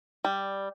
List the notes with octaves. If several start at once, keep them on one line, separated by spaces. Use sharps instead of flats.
G3